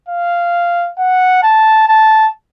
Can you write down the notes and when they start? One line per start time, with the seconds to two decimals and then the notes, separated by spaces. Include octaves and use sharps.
0.09 F5
0.98 F#5
1.43 A5
1.88 A5